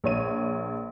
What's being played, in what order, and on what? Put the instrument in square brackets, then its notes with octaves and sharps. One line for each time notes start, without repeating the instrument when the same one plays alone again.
[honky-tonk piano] A#1 C#5 D#7